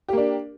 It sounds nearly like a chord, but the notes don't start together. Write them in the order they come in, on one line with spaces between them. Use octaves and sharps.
G4 A#3 D4